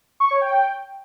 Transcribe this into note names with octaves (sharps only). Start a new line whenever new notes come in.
C#6
C#5
G5